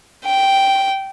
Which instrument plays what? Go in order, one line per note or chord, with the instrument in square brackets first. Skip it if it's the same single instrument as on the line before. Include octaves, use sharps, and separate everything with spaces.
[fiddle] G5